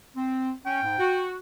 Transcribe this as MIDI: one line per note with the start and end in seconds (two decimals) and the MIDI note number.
0.16 0.51 60
0.66 0.82 61
0.66 1.24 79
0.84 0.97 44
0.99 1.36 66